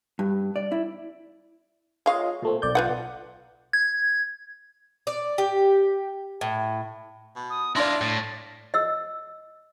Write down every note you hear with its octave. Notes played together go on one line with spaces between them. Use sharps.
G2
D5
E4
G#3 F4 C#5 D#5 F5
A#2 A3 C4
B1 D5 G6
F4 B4 F#5
G#6
D5
G4
A2
B2
D#6
D4 E4 D5 F5 C6 A#6
A2 A5
D#5 E6